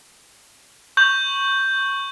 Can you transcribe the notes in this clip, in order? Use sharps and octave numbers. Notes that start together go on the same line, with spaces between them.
C#6 G6 F#7